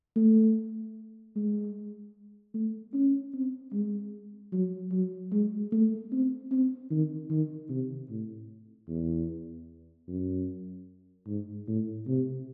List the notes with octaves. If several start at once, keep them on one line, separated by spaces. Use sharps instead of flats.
A3
G#3
A3
C#4
C4
G#3
F#3
F#3
G#3
A3
C4
C4
D#3
D#3
C3
A2
E2
F#2
G#2
A2
C3